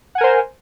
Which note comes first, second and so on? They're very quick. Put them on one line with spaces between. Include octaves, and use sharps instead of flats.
F#5 G#5 A#4 C5